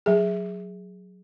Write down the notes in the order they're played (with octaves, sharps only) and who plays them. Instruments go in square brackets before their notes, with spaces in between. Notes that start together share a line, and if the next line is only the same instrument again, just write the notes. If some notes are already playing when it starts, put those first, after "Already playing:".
[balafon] F#3 G#4